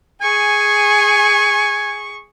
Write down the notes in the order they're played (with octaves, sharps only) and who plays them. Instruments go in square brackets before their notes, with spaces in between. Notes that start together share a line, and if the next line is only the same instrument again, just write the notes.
[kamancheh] G#4 C#6 [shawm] G#5